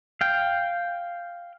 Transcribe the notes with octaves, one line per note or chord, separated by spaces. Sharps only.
F5 G5